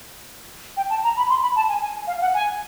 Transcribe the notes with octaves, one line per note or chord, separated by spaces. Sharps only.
G5
A5
A#5
B5
C6
B5
A5
G#5
G#5
F5
F#5
G#5